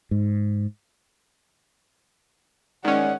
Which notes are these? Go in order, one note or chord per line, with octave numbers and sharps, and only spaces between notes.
G#2
D#3 G#3 C#4 D5 F#5